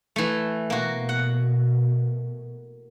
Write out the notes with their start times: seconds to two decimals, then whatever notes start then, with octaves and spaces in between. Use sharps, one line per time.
0.16 E3 A3
0.70 B2 A#3 F#4
1.09 F#5